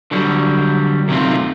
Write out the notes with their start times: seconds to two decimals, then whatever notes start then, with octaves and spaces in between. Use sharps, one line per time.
0.11 D3 F#3 G3
1.08 F#2 C3 D#3 A3 C4 F4